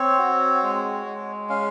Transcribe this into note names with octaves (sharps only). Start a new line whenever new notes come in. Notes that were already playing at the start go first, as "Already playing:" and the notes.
Already playing: C4 C#5
F#4
G#3
G#3
C#4 F5